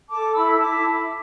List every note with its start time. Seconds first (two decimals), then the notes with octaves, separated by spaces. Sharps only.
0.09 A4 A5 D6
0.34 E4 B5 E6
0.50 E6
0.58 E4 A5 D6